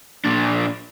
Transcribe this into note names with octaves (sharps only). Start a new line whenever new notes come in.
A#2 D4